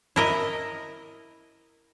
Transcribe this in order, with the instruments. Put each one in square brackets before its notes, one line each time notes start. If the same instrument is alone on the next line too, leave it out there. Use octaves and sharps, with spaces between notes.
[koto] E4 A#4 D#5